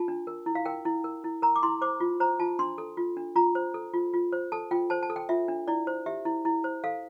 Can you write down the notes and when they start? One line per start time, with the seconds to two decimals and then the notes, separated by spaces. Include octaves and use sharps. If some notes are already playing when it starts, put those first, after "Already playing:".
Already playing: F4 A5
0.08 D4
0.27 A#4
0.46 E4
0.55 F5
0.65 A#4 G5
0.85 E4
1.04 A#4
1.24 E4
1.42 A#4 A#5
1.56 D6
1.63 E4 C6
1.81 C5 D6
2.00 F4
2.20 C5 A#5
2.40 F4 A5
2.59 D4 C6
2.78 A4
2.97 F4
3.17 D4
3.36 F4 A#5
3.55 C5
3.74 A4
3.94 F4
4.14 F4
4.32 C5
4.52 A4 A5
4.71 F4 G5
4.90 C5 A5
5.03 A5
5.10 A4
5.16 G5
5.29 F4 E5
5.48 D4
5.68 E4 D5
5.87 C5
6.06 G4 E5
6.25 E4
6.45 E4
6.64 C5
6.84 A4 F5